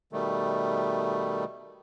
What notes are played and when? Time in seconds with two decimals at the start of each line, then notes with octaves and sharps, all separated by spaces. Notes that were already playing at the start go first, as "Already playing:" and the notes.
0.13 B2 D#3 G3 A3